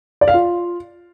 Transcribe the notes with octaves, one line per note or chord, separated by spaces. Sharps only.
D5
F5
F4